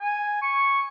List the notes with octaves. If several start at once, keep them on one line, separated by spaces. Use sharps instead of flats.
G#5
C#6